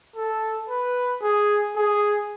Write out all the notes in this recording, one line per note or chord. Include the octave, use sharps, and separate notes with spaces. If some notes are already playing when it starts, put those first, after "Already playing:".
A4
B4
G#4
G#4